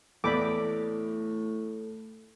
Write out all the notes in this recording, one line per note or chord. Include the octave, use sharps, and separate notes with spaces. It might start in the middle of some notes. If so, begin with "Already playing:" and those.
E2 A2 A4 D5 B5 D6